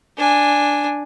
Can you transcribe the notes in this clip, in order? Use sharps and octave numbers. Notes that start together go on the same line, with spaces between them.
D4 G#5